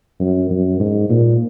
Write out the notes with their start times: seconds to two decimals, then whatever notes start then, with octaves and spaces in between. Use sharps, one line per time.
0.20 F#2
0.50 F#2
0.80 G#2
1.10 A#2